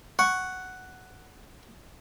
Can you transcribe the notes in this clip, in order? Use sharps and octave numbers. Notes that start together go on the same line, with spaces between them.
F#5 C#6